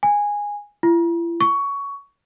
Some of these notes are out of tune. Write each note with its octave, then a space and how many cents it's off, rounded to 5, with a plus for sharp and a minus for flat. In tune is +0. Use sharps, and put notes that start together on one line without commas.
G#5 -10
E4 +45
C#6 +15